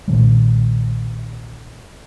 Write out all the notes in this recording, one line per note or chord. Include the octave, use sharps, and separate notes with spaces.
B1 A#2 D#3 G#3